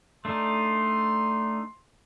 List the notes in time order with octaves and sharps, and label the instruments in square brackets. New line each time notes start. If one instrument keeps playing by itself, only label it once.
[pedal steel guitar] A3 D4 D#4 [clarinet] C6